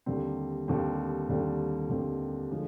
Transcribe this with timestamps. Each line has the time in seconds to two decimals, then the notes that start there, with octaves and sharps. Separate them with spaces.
0.06 D#2 D3 G3 C4
0.68 D#2 D3 G3 C4
1.29 D#2 D3 G3 C4
1.90 D#2 D3 G3 C4
2.50 D3 F3 G#3 C#4